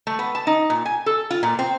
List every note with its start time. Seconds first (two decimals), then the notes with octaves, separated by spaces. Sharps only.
0.07 A3
0.19 B3
0.35 A5
0.47 D#4
0.70 A#2
0.85 G#5
1.06 A4
1.30 F4
1.43 A#2
1.59 C4